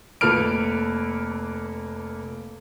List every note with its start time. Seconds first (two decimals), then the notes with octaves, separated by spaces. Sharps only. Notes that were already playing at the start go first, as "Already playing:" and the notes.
0.21 F1 A#3 A4 B4 F6 D7